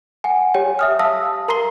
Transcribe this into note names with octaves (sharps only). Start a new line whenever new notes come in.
F#5 G#5
G4 C#5 G5 G#5
E5 D#6 F6
F5 A5 D#6 E6 A#6
A#4 A#5 C6 C7 G7